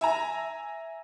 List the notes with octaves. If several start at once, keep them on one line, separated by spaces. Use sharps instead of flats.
E5 G#5 A#5